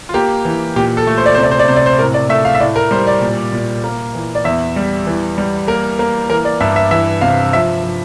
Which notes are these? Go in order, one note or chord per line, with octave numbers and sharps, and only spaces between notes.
F4
A#3 G4
E3
A#2 G4
A4
A3
C5
D5
C3 C5
D5
C5
D5
C3 C5
D5
C5
A2 A#4
D5
A3 E5
F5
E5
A2 D5
A#4
G3 C5
D5
A#2
A#2
A#3
E3
D5
E2 E5
G3
E3
G3
A#3 A#4
A#3
E3 A#4
D5
G2 E5
E5
E3 E5
C3 F5
F3 E5
F3